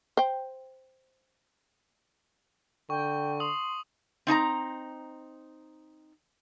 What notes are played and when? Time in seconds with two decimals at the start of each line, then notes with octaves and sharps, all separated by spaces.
0.17 C5 G5
2.90 D3 G5 C#6
3.40 C6 D#6 F#7
4.27 C4 D#4 G#5 A#5